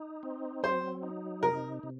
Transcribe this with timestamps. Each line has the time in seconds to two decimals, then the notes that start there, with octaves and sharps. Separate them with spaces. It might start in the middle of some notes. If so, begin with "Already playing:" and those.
Already playing: D#4
0.23 C4
0.63 F#3 C5
1.03 D#4
1.43 C3 A#4
1.83 C3